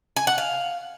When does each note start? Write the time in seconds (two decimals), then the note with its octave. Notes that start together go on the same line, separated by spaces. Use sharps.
0.17 G#5
0.27 F#5
0.38 F5